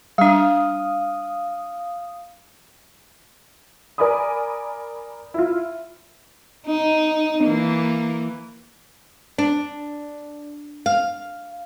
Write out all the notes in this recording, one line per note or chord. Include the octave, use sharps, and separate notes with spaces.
G3 D4 F5 D#6
A#4 D5 G#5 B5 D#6
E4 F4
D#4
E3 A#3
D4
F5